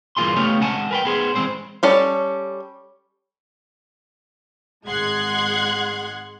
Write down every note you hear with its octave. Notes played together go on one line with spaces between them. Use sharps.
G2 E3 A#3 F4 G#4 C6
C#3 A3 B3 G4 C#5 F5
G#3 F#5 G#5 A5
A#4 B4 G5
B3 G#4 C5
E3 F3 G#3 C4 C5
G3 C#4 A4
G#1 G#3 F#5 C6 F#6 G#6